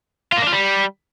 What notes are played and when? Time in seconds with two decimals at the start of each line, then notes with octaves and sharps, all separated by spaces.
0.32 F4
0.37 A#3
0.42 D4
0.47 F4
0.52 G3